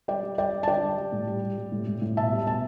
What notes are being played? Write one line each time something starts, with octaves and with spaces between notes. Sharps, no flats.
G3 D5 G5
G3
G3 D5 G5
G3
A5
D3 D5 G5
G3
G3
A2
G3
G3
G3
A2
A2
A2
B2 E5 A5
G3
B2 E5 A5